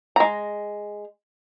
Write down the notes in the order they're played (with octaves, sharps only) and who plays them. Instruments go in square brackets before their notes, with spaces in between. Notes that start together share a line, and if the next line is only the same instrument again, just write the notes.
[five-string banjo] G#3 A#5